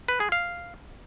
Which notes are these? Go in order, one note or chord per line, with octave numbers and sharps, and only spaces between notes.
B4
G#4
F5